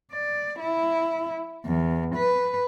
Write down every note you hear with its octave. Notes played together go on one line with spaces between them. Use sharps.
D5
E4
E2
B4